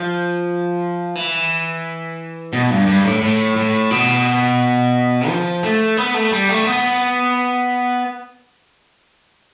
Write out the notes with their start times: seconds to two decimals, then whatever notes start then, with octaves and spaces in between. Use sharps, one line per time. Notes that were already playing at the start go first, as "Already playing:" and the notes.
Already playing: F3
1.15 E3
2.53 B2
2.71 G2
2.87 G2
3.05 A2
3.22 A2
3.56 A2
3.91 B2
5.28 F3
5.63 A3
5.97 B3
6.14 A3
6.32 G3
6.49 A3
6.67 B3